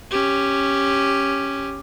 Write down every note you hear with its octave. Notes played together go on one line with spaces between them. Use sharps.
C#4 G4